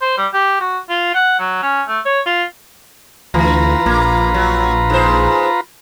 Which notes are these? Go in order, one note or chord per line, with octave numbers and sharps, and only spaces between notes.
C5
G3
G4
F#4
F4
F#5
F#3
C#4
A3
C#5
F4
D2 E3 F4 B4 A#5
A#1 A#3
F#3
G#2 C5